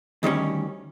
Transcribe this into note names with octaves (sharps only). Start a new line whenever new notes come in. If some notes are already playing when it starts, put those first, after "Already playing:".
D2 D#3 G3 C#4